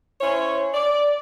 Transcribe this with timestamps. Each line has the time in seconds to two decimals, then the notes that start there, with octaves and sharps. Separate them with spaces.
0.21 C#4 E4 C5 C#5
0.74 D5